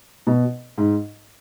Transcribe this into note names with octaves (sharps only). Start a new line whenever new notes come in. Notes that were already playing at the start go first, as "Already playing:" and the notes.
B2
G#2